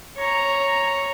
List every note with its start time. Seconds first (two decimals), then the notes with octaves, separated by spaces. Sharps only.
0.18 C#5 A#5